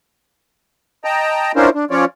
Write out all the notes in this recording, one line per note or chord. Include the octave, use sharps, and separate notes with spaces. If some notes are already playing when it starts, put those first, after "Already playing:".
D#5 G5 A5 A#5
C#4 D4 E4 F4 A#4 C5
D4
F3 C#4 F4 C#5 D5